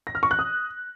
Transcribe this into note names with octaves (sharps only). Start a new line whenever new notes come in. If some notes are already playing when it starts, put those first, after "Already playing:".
A#6
F6
C#6
F#6
D#6